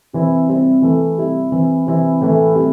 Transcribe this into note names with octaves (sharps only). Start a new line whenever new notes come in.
C3 E3 C4 E4
C3 G3 C4 E4
E3 A3 E4
C3 G3 E4
E3 C4 E4
C3 E3 C4 E4
A2 E3 A3 E4
C3 G3 E4